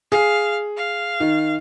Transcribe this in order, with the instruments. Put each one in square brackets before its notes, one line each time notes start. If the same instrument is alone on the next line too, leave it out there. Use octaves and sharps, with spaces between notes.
[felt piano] G#4 [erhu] F5
[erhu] F5
[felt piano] D#3